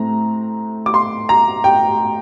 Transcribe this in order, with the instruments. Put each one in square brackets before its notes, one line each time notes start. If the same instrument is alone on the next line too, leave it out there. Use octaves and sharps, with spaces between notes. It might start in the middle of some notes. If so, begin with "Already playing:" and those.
Already playing: [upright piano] A2 A3 C4 A#5
D6
C6
A#5
G5